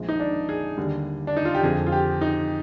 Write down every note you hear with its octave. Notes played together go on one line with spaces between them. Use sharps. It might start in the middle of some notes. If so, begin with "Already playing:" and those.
Already playing: A#1 A#2 F3 G#3
D#4
D4
G#4
D#2 D3 G3
D4
D#4
F4
G4
F2 D3 F3 G#4
F4
G4
D#4